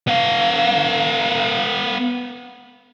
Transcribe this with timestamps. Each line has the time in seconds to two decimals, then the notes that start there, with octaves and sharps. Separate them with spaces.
0.08 B3 F5